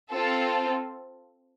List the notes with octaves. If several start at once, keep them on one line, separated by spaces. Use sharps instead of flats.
C4 F4 A4